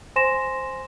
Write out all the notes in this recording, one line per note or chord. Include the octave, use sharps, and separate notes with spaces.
C5 G#5 C6 A#6 E7